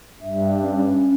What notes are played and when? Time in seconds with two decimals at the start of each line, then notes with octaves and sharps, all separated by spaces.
0.21 G2 E5
0.62 C#4